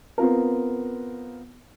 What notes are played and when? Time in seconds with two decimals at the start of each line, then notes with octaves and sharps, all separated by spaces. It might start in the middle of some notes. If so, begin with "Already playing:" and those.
0.18 B3 C4 F4 A#4